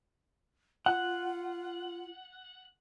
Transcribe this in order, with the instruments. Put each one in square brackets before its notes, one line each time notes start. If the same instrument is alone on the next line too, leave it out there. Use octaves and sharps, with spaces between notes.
[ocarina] F4 [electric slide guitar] F#5